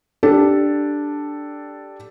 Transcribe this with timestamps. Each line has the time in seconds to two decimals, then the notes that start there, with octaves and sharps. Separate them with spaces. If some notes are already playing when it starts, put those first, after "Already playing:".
0.23 D4 G4 A4